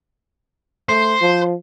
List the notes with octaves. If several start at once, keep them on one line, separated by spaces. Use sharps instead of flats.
A3 C5
F3